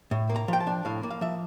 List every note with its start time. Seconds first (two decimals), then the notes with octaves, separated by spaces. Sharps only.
0.11 A2
0.30 A#3
0.36 A#5
0.48 F3 G5
0.60 A5
0.67 D4
0.85 A2 F5
1.03 A#3
1.11 F5
1.21 F3 E5